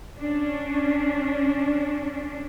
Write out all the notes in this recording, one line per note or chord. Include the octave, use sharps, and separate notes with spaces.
C#4 D4